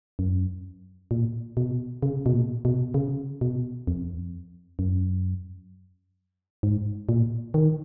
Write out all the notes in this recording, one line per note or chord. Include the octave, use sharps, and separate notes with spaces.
F#2
A#2
B2
C#3
B2
A#2
B2
C#3
B2
F2
F#2
G#2
A#2
D#3